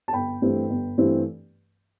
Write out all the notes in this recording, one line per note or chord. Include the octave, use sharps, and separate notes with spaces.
A5
G1 G5 B5
G2 E3 A3 C4
G1
G2 E3 A3 C4